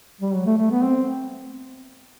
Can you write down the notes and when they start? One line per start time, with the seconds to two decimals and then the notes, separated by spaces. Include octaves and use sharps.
0.21 G3
0.34 F#3
0.46 A3
0.58 A3
0.71 B3
0.84 C4